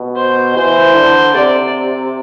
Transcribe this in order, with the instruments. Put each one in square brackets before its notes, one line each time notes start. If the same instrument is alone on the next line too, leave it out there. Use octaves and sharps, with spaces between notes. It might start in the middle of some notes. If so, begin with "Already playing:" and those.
Already playing: [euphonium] B2
[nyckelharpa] C5
[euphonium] E3 [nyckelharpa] C5
[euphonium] D3
[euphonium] C3 [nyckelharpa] D5